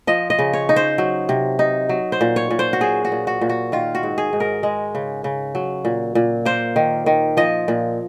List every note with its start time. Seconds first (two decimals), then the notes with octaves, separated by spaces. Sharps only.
0.07 F3 D#5
0.30 D#5
0.39 C#3
0.53 C#5
0.69 D#4
0.76 C5
0.98 F#3
1.29 C3
1.59 D#4
1.89 F#3
2.12 C5
2.21 A#2
2.36 C#5
2.51 A#2
2.59 C5
2.73 F#4
2.81 F#3 G#4
3.05 F#4
3.12 A#2
3.27 F#4
3.41 A#2
3.49 F#4
3.72 D#3 F4
3.95 F#4
4.03 G#2
4.18 G#4
4.33 G#2
4.40 A#4
4.63 G#3
4.95 C#3
5.24 C#3
5.55 F#3
5.85 A#2
6.15 A#2
6.45 A#3 C5
6.76 D#3
7.06 D#3
7.37 F3 D#5
7.68 A#2